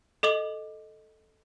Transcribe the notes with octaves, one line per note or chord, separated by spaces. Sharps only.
A4 D#5 D6 F#7